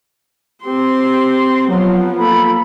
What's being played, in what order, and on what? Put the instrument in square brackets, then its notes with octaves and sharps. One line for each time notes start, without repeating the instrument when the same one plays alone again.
[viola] C4 C6 [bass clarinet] G4
[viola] F3 B3 [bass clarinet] F#3
[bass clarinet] A#3 [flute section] A4 B5